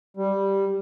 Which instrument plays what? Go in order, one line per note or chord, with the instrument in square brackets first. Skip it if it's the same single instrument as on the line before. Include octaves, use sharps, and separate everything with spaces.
[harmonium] G3